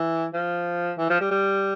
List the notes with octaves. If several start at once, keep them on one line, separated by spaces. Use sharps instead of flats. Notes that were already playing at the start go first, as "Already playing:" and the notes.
Already playing: E3
F3
E3
F3
G3
G3